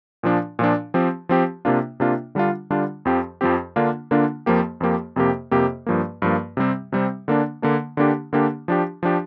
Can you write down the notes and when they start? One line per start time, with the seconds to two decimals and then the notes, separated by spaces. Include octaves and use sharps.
0.23 A#2 F3 D4
0.59 A#2 F3 D4
0.94 F3 C4 G4
1.29 F3 C4 G4
1.65 C3 A#3 D4 F4
2.00 C3 A#3 D4 F4
2.35 D3 G3 D4 F4
2.70 D3 G3 D4 F4
3.05 F2 F3 C4 G4
3.41 F2 F3 C4 G4
3.76 D3 A#3 D4 F4
4.11 D3 A#3 D4 F4
4.46 F2 F3 A#3 G4
4.80 F2 F3 A#3 G4
5.16 F2 C3 A#3 G4
5.51 F2 C3 A#3 G4
5.87 G2 F3 A#3
6.22 G2 F3 A#3
6.57 C3 G3 C4
6.92 C3 G3 C4
7.28 D3 A#3 D4
7.62 D3 A#3 D4
7.97 D3 A#3 D4 G4
8.33 D3 A#3 D4 G4
8.68 F3 D4 G4
9.03 F3 D4 G4